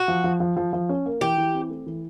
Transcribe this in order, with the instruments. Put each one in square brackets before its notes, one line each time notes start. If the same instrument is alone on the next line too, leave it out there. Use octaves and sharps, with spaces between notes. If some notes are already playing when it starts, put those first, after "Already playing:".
Already playing: [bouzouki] F#4
[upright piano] F3
F3
F3
F3
F3
C#4
A#3
[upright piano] E3 [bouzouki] G4
[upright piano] E3
C4
A3
E3